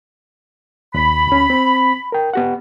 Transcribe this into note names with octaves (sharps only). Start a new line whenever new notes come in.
D#2 B5
D2 C#4
C4
A#4 G5
B3 G4 F#5